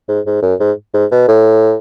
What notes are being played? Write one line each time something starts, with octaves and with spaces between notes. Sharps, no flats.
G#2
G#2
F#2
G#2
G#2
B2
A2